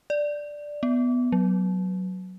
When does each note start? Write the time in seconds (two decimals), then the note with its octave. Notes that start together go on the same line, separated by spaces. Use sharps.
0.10 D5
0.83 B3
1.32 F#3